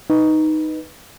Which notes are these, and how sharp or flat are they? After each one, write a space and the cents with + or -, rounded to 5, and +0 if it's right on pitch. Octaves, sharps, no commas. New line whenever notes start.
D#4 +0 B4 +0